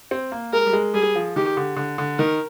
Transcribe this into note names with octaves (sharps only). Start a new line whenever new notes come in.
C4
A#3
G#3 A#4
G3
G#3
G3 G#4
F3
D#3 G4
D3
D3
D3
D#3 A#4